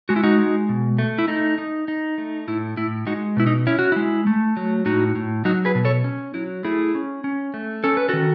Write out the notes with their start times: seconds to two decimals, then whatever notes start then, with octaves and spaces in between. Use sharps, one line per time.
0.09 G#3 F#4
0.16 E4
0.24 D#4 F#4
0.39 G#3
0.69 B2
0.98 A3
1.19 E4
1.28 A3 D#4
1.58 D#4
1.88 D#4
2.18 A3
2.48 A2 E4
2.77 A2 E4
3.07 G#3 D#4 F#4
3.37 B2 E4
3.47 D#4
3.67 C#4 E4
3.79 F#4
3.92 G#3 E4
4.27 A3
4.57 F#3
4.86 A2 D#4 F#4
5.15 A2
5.45 F#3 D#4 F#4
5.65 G#4 B4
5.75 B2
5.85 A4 C#5
6.04 C#4
6.34 F#3 E4
6.65 A3 E4 G#4
6.95 C#4
7.24 C#4
7.54 A3
7.84 C#4 A4
7.97 B4
8.09 D#3 F#4 A4